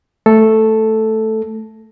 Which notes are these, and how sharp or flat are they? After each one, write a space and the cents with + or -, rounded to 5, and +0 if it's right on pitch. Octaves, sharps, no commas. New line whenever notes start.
A3 +0 A4 +0